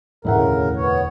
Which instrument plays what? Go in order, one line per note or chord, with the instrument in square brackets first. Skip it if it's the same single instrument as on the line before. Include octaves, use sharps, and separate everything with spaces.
[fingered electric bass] E1 A1 D2 [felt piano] A2 E5 F#5 [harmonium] C#3 A#4
[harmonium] B3 C#5